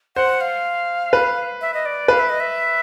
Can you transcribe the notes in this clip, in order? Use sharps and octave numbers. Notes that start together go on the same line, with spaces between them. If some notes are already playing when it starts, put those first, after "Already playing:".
C5 F#5
F5
B4
E5
D#5
D5
B4 F5
E5
D#5
E5